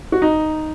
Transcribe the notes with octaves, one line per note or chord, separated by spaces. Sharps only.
F#4
D#4